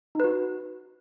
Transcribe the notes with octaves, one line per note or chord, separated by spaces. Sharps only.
D#4 F#4 B4